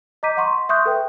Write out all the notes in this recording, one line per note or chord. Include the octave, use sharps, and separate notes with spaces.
D#5 A#5 D6 G6 B6 D#7
F#5 C6 C#6
E5 C6 C#6 D#6 F#6 G6
A4 B4 G5